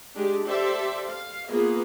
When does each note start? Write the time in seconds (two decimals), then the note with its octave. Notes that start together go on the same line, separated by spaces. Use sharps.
0.15 G#3 D4 G4
0.45 G4 A4 C5 D5 E5
1.08 F5
1.48 A#3 B3 F4 G#4